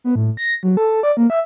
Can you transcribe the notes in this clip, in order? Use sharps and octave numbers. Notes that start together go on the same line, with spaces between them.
B3
A2
A#6
F#3
A4
D5
A#3
E5